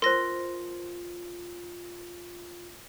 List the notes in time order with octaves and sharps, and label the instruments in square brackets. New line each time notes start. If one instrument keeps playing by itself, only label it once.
[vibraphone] F4 [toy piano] A#4 C5 [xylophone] C6 A#6